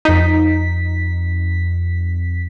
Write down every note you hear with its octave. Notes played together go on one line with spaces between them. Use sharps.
F2 D#4 B6